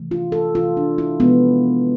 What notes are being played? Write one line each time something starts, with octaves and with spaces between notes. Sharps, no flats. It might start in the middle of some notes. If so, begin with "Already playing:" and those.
Already playing: C3 E3 A3
F4
A4
C3 E3 A3 F4
D4
E4
C3 F3 G#3 B3